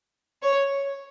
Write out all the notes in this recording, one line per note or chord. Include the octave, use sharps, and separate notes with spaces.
C#5